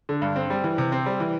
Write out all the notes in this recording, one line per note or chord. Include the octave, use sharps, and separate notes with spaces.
D3
G2
C4
G3
E3
C3
C4
G3
E3